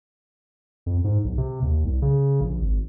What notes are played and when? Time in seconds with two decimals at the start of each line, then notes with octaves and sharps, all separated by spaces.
0.86 F2
1.04 G#2
1.24 B1
1.38 C3
1.62 D#2
1.85 C2
2.02 C#3
2.41 A#1
2.62 G#1